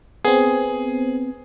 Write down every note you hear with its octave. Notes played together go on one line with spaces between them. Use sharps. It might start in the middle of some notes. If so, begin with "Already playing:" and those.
B3 C4 G#4